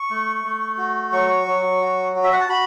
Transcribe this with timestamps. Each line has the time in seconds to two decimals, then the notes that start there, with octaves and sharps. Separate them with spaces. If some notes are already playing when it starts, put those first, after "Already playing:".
Already playing: C#6
0.10 A3
0.44 A3
0.78 F#4
1.12 F#3 C#6
1.47 F#3
1.81 F#4
2.16 F#4
2.24 E5
2.33 F#5
2.40 A5
2.49 F#4 B5